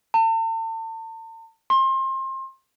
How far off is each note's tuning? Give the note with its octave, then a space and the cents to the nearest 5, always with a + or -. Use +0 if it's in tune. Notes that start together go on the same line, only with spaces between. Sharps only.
A5 +40
C6 +30